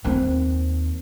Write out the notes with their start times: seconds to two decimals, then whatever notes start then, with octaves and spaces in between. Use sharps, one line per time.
0.04 D#2 C4